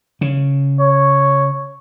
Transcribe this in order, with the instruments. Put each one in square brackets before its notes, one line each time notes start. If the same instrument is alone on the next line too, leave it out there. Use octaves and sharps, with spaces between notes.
[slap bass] C#3
[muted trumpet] C#5